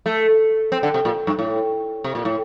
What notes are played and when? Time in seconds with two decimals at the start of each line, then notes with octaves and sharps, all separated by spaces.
0.06 A3
0.72 C4
0.83 D3
0.94 C3
1.05 A#2
1.27 G2
1.39 A2
2.04 C3
2.15 A#2
2.25 A2